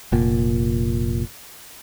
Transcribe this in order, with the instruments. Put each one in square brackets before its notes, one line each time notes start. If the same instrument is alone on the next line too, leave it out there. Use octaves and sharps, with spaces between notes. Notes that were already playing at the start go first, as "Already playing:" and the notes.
[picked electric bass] F1 A#2